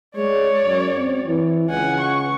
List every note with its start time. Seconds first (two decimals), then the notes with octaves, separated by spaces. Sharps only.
0.16 G#3 C#5 D5
0.65 F#2
0.97 C4
1.27 E3
1.70 C#2 F#5 G#5
2.00 C#6